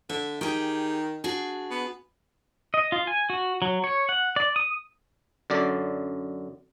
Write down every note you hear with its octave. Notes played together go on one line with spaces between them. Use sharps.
D3 E5
D#3 G4 G#4
D4 F#4 G#4
B3
D#5
F4
G#5
F#4
F#3
C#5
F#5
D5
D#6
F#2 D3 D5